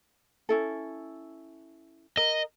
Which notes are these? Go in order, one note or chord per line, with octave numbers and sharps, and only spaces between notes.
C#4 E4 A4
A#4 D#5